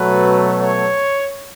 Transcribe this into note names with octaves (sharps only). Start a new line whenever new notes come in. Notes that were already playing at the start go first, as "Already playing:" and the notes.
Already playing: B2 F#3 A3 B4
C#5